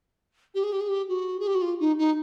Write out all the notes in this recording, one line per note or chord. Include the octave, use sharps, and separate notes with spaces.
G4
G#4
G4
G#4
G4
F#4
G#4
G4
F#4
F4
D#4
D#4